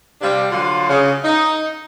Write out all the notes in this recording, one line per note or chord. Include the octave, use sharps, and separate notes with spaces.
C3 G3 D4 F5
D3 F#3 F4
C#3
D#4